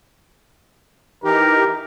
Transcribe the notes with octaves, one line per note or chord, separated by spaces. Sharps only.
E3 D#4 G4 A#4